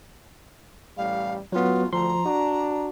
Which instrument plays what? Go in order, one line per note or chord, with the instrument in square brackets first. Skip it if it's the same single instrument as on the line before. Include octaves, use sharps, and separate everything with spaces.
[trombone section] A1 A2 G3 [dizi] F5
[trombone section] F#2 A2 F#4 [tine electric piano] F#3 B3 [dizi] F4
[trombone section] D2 [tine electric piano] F3 C6 [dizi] A#5
[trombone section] D4 [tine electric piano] F#4